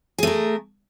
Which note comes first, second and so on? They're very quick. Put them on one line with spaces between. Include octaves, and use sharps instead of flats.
G#4 A3 A#4